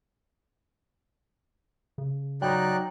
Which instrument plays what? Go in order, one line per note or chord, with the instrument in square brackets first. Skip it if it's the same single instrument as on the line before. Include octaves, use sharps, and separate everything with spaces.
[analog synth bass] C#3
[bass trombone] F#3 [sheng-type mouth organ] D#4 D5 F#6 [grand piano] G5 A#5